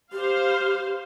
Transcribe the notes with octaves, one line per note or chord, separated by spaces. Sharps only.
G4 C5 F5